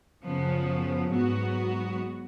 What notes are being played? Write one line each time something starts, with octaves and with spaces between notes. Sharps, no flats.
F#2 C#3 F3 B3
G#2 F#3 B3 F#4